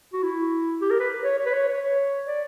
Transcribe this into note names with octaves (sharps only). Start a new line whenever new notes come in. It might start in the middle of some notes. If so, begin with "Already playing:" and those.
F#4
E4
G4
A#4
B4
C#5
C#5
B4
C#5
C#5
D5